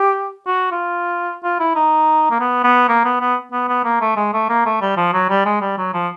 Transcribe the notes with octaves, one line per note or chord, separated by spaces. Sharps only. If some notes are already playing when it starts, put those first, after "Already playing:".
Already playing: G4
F#4
F4
F4
E4
D#4
A#3
B3
B3
A#3
B3
B3
B3
B3
A#3
A3
G#3
A3
A#3
A3
G3
F3
F#3
G3
G#3
G3
F#3
F3